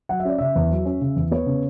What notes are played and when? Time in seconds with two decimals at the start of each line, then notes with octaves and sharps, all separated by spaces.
0.09 F#3 F#5
0.20 E5
0.25 C#4 D5
0.38 C#3 E5
0.55 E2
0.70 F#3
0.85 C#4
1.01 C#3
1.16 E2
1.31 B3 C#5
1.46 C#3